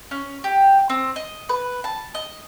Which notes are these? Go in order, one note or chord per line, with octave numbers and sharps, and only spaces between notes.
C#4
G4
C4
D#5
B4
A5
D#5